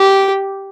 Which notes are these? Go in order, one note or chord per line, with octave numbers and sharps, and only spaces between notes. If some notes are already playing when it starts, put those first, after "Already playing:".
Already playing: G4